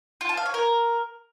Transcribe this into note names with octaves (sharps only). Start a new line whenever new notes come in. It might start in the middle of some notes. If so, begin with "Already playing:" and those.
F4
A5
F5
C#5
A#4